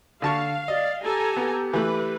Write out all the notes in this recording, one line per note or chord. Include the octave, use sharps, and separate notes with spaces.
D3 F5 A5 C#6
D5 D#5
G4 A4 G#5 A#5
B3
E3 A3 B4